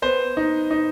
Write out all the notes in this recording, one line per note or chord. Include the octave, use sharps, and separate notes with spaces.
B3 C5
D#4
D#4